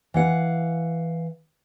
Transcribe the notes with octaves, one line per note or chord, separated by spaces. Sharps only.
E3 F5 F#5